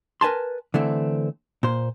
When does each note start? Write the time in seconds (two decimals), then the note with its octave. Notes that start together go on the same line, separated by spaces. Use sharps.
0.21 A#4 B4 G#5 A5 C6
0.74 D3 E3 A3 C4
1.63 A#2 C5